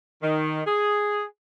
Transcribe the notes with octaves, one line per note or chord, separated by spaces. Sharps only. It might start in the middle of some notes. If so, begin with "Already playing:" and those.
D#3
G#4